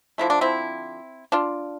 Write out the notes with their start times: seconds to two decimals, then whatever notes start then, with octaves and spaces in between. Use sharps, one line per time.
0.18 D3 F3 A3 E4
0.30 D4
0.41 C4 E4
1.32 D4 F4